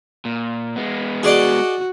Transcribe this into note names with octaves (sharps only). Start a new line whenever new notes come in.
A#2
G#3 B3
F#4 G#4 D5 D#5